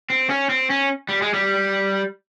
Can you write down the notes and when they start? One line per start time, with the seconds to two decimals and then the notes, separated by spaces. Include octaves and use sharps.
0.10 C4
0.30 C#4
0.49 C4
0.70 C#4
1.09 G3
1.22 G#3
1.34 G3